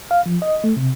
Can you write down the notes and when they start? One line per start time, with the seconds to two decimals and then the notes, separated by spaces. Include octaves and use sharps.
0.11 F5
0.26 F3
0.42 D#5
0.64 A3
0.77 C3